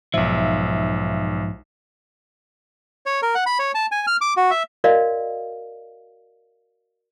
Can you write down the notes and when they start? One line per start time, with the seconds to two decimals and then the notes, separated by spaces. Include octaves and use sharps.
0.14 B1 G#2 F3 E5
3.06 C#5
3.22 A#4
3.35 F#5
3.46 B5
3.59 C#5
3.75 A5
3.92 G#5
4.07 F6
4.21 D6
4.37 F#4
4.51 E5
4.84 F#4 A#4 D5 D#5 F5